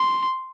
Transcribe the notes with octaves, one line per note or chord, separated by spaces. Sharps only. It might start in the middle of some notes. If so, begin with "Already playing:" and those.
Already playing: C6